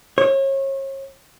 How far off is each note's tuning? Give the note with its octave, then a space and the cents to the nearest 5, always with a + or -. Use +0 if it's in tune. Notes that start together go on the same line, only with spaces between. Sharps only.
C#5 -35